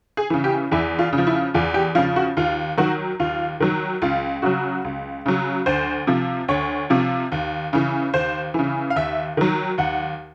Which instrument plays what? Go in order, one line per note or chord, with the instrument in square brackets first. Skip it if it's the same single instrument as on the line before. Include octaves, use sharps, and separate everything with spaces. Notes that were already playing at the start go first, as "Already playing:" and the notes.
[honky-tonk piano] G#4
C#3 E3
G4
E2 E4
F4
C#3
F3
E4
E2 F4
G4
C#3 F3 F4
F#4
D#2 F4
D#3 F#3 F#4
D#2 F4
D#3 F#3
C#2 F4
C#3 F#3 F#4
C#2
C#3 F#3
D2 C5
C3 F3
D2 C#5
C3 F3
D#2
C#3 E3
D#2 C5
C#3 E3
F5
D#2 E5
D#3 F#3
D#2 F#5